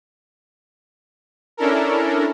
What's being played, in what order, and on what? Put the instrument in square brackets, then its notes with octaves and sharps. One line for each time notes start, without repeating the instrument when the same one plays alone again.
[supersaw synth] C#4 D4 E4 A4 A#4